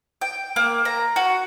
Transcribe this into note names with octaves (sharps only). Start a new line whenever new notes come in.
G5
A#3
A#5
F#4